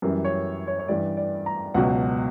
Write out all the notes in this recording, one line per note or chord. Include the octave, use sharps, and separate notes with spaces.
F#2 E3 G3 A#4
C#5
C#5
C#5
G2 E3 G3 D5
D5
A#5
C#2 B2 F#3 F#5